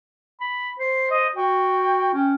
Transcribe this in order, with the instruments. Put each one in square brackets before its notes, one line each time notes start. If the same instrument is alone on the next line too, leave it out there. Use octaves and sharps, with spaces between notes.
[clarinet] B5
[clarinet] C5 [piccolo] C7
[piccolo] D#5
[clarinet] F#4 [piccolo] G5
[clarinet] C#4